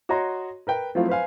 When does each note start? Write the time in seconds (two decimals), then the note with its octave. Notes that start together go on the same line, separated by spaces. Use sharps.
0.09 F#4 C#5 D#5 A#5 C6
0.67 A#4 B4 G5
0.95 F3 F#3 A3 C4 E4 F4
1.09 B4 C5 F5 G#5